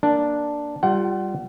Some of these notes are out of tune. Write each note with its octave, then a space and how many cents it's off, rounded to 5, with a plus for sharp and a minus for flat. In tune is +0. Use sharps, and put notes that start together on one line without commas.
A#3 +0 D4 +0
G3 +0 F4 +0 F#5 +35